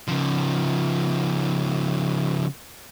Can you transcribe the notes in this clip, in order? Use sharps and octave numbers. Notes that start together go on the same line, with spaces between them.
C#3 F3